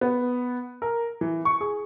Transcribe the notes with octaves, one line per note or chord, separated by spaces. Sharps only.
B3
A#4
E3
C#6
G#4